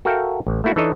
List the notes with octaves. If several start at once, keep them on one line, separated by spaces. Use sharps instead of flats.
F#4 A4 A#4 E5 F5 G5
A1
A3 A#3 E4 F#4
E3 D4 D#4 A4 C#5 D#5